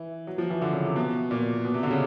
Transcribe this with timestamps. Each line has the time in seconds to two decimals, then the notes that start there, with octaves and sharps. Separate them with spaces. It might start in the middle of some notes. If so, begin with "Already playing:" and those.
Already playing: E3
0.27 F#3
0.38 F3
0.50 E3
0.62 D3
0.73 C#3
0.85 C3
0.96 B2
1.31 A#2
1.65 B2
1.74 C3
1.83 D3
1.91 C#3